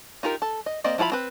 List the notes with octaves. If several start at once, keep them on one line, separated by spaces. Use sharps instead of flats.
D#4 F4 G4 A#4
A4
D#5
A#3 C4 D5 D#5
F3 E4 F4 A#5 B5
C4 B4